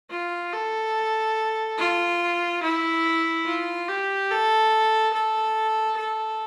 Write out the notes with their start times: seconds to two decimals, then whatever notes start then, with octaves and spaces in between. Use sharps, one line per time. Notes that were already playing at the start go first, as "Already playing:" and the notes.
0.11 F4
0.53 A4
1.78 F4
2.63 E4
3.46 F4
3.89 G4
4.31 A4
5.14 A4
5.98 A4